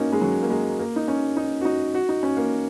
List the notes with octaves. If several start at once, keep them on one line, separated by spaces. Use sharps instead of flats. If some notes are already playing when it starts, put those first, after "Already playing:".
Already playing: A#3 C#4 D#4 F#4
G#3
F#3
A#3
G#3
A#3
D#4
C#4
D#4
F#4
D#4
F#4
D#4
C#4
A#3